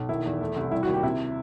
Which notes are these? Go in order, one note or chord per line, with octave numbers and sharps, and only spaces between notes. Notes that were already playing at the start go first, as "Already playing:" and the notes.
Already playing: B1
D#3 E4
E2
A3
C2
G3 E4
F#4
D#2
G4
C3 E4